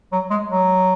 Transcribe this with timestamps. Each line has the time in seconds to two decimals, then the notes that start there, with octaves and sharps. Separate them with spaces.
0.12 F#3
0.30 G#3
0.49 F#3